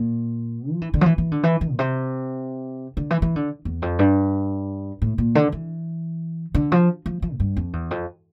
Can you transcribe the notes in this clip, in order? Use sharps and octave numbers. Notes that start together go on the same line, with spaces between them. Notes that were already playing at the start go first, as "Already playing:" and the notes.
Already playing: A#2
F3
E3
D3
F3
E3
E3
D3
E3
E3
A#2
C3
D3
E3
E3
D3
E2
F2
G2
A2
A#2
D3
E3
D3
F3
F3
F3
A2
G2
F2
E2
F2